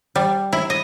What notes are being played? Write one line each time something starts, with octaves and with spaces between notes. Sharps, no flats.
G3
E4
D#5